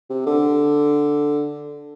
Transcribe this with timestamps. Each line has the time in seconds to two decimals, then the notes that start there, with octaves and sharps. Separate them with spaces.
0.10 C3
0.26 D3